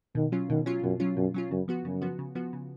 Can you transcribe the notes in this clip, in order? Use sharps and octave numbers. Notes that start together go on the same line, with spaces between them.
B2 D#3
F#3 C#4 F4
B2 D#3
F#3 C#4 F4
F#2 B2
F#3 C#4 F4
F#2 B2
F#3 C#4 F4
F#2 C#3
F3 B3 F#4
F#2 C#3
F3 B3 F#4
C#3
F3 B3 F#4
C#3